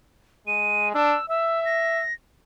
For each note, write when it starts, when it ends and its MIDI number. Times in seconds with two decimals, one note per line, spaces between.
0.47 0.93 56
0.47 0.89 99
0.94 1.16 62
0.94 1.26 88
1.30 2.04 76
1.30 1.63 88
1.65 2.13 94